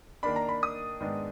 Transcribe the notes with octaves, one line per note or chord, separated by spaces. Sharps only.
D#3 A#3 D4 B5
A#5
B5
D#6
G#2 D#3 G#3 B3 D4